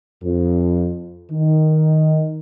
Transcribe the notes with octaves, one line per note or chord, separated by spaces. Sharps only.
F2
D#3